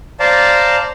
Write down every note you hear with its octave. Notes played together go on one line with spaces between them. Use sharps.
C5 D5 F5 A5 A#5